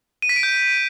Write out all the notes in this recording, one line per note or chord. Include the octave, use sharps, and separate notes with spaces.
D#7
B6
D7
G6